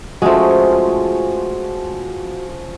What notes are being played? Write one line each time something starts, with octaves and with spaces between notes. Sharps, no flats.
F3 G#3 A3 C#4 F#4 G#4